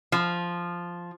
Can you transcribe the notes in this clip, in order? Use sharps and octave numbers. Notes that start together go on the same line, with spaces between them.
F3